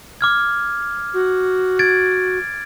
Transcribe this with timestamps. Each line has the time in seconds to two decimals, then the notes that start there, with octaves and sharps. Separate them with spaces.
0.21 D6 F6 G#6
1.13 F#4
1.79 G#6 A6 D7